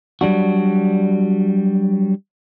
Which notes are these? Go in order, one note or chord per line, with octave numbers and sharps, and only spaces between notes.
F#3 G3 D4 F#4